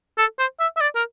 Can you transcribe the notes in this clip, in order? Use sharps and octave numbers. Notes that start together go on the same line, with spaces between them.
A4
C5
E5
E5
D5
A#4